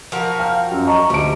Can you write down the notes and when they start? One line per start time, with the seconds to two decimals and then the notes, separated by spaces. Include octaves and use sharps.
0.12 F3 F#4 A#4
0.38 F5 G5 F6
0.71 F#2
0.87 D#5 A#5 C#6
1.10 D2 G3 D7